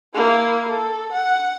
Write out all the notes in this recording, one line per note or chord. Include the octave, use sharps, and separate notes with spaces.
A#3 E4
A4
F#5